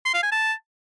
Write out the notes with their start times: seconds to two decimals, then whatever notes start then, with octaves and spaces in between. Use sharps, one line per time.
0.05 C6
0.14 F5
0.23 G#5
0.31 A5